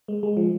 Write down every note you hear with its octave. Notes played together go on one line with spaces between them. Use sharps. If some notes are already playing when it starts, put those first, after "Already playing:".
G#3
G#3
F3